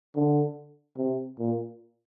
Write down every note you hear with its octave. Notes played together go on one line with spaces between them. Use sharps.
D3
C3
A#2